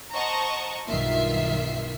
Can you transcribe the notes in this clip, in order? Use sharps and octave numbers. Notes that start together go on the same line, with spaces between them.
C5 D#5 F#5 A5 A#5 C#6
B1 G2 D#3 F4 E5 C7